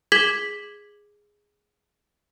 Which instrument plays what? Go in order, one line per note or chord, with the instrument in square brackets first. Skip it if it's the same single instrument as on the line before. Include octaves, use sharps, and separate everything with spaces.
[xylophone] G#4 G#6 B6 F#7 G7